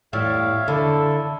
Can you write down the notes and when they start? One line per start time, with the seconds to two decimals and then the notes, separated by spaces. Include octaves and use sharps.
0.13 A2 G3 C#5 E5 F5
0.68 D3 E4 A4